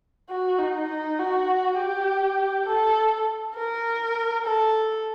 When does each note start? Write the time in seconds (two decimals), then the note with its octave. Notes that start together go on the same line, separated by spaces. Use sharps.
0.30 F#4
0.59 D#4
0.90 D#4
1.19 F#4
1.78 G4
2.66 A4
3.55 A#4
4.45 A4